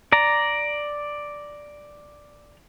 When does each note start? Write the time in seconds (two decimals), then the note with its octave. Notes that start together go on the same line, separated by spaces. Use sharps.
0.12 D5 A#5